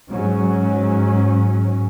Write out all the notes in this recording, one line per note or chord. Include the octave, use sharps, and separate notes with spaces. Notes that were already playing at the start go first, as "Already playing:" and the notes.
G#2 F#3 C#4